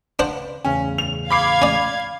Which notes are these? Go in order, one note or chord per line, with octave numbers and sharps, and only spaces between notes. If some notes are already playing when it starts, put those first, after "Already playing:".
C#3 D4 B4 C5 F#5
E2 A2 C#3 C#4
F7
F5 B5 D6 G#6 C7
C#4 D5